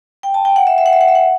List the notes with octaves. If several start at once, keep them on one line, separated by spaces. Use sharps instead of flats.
G5
A5
G5
F#5
E5
E5
F#5
E5
F#5
E5
F#5